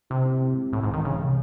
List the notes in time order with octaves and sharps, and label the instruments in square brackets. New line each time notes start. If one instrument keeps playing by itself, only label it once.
[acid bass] C3 [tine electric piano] E4
[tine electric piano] C4
C4
G#3
[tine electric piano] C2 [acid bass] A2
[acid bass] G#2
[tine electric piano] E3
[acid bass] D#3
[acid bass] C#3 [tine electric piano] E3
[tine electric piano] C3